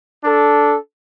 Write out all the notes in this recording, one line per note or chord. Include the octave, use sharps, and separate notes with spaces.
D4 A4